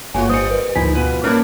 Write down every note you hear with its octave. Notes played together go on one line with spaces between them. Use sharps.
G1 A3 A#3 F4 F#4 C#5 G#5
G3 C5 D#5 D#6 C#7
A#4 B4
D2 F3 D#4 E4 A#4 G#5 B6
F2 B2 F4 B4
F#2 A#3 C#4 D4 E4 A#4 F6